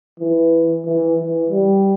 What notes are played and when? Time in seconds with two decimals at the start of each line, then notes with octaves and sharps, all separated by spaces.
0.20 E3
0.85 E3
1.18 E3
1.50 G3